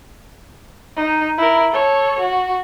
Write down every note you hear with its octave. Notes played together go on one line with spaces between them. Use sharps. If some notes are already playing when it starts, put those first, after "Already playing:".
D#4
E4 A#4
A4 C#5
F#4